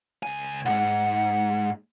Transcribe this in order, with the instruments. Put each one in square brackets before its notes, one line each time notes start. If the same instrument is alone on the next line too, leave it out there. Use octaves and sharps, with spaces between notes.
[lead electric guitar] C#2 G#5
[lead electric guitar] B1 G#2 [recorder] F#5